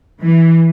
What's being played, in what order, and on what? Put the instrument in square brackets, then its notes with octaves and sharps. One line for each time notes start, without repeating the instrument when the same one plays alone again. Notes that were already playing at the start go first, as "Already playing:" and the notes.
[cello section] E3